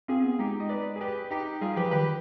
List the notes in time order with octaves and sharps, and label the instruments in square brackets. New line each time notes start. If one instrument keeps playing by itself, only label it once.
[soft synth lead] C4 [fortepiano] F4 G#4
[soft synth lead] C4
B3
[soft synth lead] G#3 [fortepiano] D#4 G4
[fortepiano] D#5
B4 D5
G#4
G4 B4
D#4 G4
[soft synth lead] G3 [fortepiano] F4 G#4
[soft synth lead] F3 [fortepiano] G4 B4
[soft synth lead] D#3 [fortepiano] G4 B4